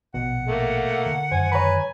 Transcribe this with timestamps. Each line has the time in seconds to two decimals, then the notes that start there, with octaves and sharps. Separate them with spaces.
0.14 A#1 B2 F#5
0.46 A3 A#3
1.06 D3
1.32 F#2 D3 D#3 C5 G#5
1.52 B4 C#5 A#5 B5